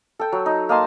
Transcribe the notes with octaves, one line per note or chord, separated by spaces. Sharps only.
A4 G5
F#3
D#4
A#3 D#5 A5 C6